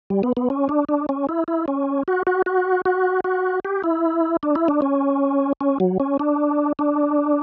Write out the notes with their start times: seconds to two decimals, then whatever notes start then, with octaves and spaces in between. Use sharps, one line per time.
0.10 G3
0.23 B3
0.37 B3
0.50 C#4
0.69 D4
0.89 D4
1.09 C#4
1.29 E4
1.48 E4
1.68 C#4
2.08 F#4
2.27 F#4
2.46 F#4
2.85 F#4
3.24 F#4
3.65 G4
3.84 E4
4.43 D4
4.55 E4
4.68 D4
4.82 C#4
5.61 C#4
5.80 F#3
6.00 C#4
6.19 D4
6.79 D4